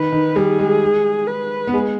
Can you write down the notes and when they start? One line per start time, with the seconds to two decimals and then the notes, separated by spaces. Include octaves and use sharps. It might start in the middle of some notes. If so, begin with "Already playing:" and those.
Already playing: D#3 B4
0.12 D#3
0.36 G3 G#4
0.59 G#3
1.28 B4
1.67 B3
1.74 G#3